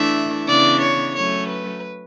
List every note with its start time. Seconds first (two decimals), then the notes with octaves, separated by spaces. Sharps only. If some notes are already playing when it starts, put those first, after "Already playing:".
Already playing: E3 A3 D4 E5
0.47 C#3 E3 B3 D4 D5
0.81 C#5
1.14 F#3 A3 C#4 C#5
1.48 B4